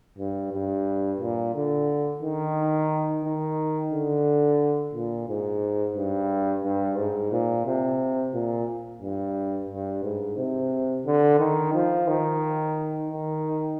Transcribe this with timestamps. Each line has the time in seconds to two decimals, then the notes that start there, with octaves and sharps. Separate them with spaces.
0.18 G2
0.53 G2
1.20 A#2
1.55 D3
2.23 D#3
3.25 D#3
3.93 D3
4.94 A#2
5.29 G#2
5.96 G2
6.64 G2
6.97 G#2
7.32 A#2
7.66 C3
8.34 A#2
9.02 G2
9.70 G2
10.03 G#2
10.38 C3
11.06 D3
11.39 D#3
11.74 F3
12.08 D#3
13.09 D#3